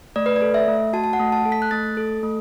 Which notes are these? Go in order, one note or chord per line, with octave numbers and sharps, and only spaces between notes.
A3 D5
B4
D5
A4
E5
A3
F#4 A5
A5
F#5
A3
A5
A4
B6
F#6
A3 A6
A4
A3